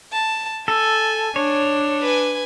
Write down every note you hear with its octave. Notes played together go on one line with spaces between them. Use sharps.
A5
A4 G#5
D4 C#5
B4 G#5